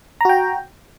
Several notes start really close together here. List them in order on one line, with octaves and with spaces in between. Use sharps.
A#5 F#4 G5